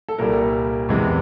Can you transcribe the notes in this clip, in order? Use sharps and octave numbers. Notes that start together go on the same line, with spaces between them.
A4
C2 A#2 G3 A#4
E2 C3 E3 G#3